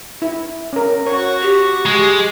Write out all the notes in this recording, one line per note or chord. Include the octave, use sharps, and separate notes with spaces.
E4
C#4 A#4
F#4 C#5 C#6
G4
G#3 G4